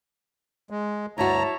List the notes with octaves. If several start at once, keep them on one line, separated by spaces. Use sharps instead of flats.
G#3
D2 G2 E4 F#4 C#5 A5 A#5